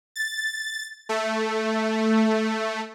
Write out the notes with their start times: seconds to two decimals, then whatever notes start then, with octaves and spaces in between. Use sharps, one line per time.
0.16 A6
1.09 A3